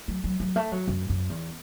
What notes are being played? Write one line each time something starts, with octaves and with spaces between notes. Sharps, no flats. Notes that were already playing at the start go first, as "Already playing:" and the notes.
F#3
F#3
F#3
A3
F#3
F#2
F#2
E2